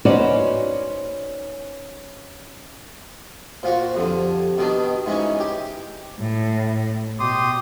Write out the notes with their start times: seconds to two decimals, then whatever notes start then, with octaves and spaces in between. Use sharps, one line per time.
0.05 C#4 D#4 F#4 B4 C5 D5
3.63 A#2 F4 F#4 C5
3.95 F2 D3 G4
4.58 B2 D#3 D4
5.06 G#2 E3 C#4 D#4
5.40 G4
6.20 A2
7.20 B2 G4 C6 D#6